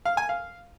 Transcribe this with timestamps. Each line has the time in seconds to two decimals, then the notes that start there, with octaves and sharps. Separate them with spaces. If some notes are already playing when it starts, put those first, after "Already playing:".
0.05 F5
0.17 G#5
0.29 F5